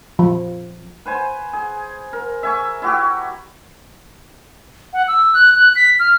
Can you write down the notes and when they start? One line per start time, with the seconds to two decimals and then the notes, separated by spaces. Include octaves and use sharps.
0.19 F3
1.06 B4 C5 G#5
1.53 G#4
2.13 A#4
2.43 E5 G#5 C#6
2.82 E4 F#4 G4
4.93 F#5
5.08 E6
5.34 F#6
5.56 F#6
5.76 B6
6.00 F6